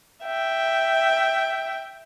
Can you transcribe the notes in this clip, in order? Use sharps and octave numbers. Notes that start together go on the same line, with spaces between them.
E5 G5